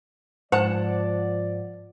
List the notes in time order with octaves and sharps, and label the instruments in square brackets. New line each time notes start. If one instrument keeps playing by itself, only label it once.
[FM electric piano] G#2 [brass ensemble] F3 D5 [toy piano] C5 [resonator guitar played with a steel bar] F#5 A5